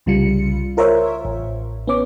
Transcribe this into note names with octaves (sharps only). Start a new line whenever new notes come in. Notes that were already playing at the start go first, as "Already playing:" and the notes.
C2 C#3 G3 F4 C#7
F4 A#4 C5 C#5 E5
A1
B3 C#4 C#5 D6